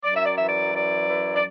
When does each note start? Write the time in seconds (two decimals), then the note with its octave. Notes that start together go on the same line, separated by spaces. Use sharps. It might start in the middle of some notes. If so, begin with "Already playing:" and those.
0.04 F#2 D5
0.15 E5
0.25 D5
0.36 E3 E5
0.46 D5
0.74 F#2 D5
1.09 E3
1.35 D5